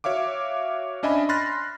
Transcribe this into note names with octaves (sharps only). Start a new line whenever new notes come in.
F#4 C#5 E5 F5 D6
C#4 D4 D#5 E5 G#5 B5
B5 C6 F6 F#6 A6 A#6